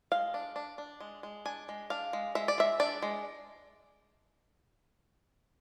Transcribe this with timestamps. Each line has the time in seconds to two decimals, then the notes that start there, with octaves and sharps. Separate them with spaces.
0.12 G#3 F5
0.34 D4
0.56 D4
0.78 D4
1.00 G#3
1.23 G#3
1.45 D4 G#5
1.69 G#3
1.90 D4 F5
2.13 G#3
2.35 G#3 E5
2.48 D5
2.58 G#3 E5
2.80 D4 D5
3.02 G#3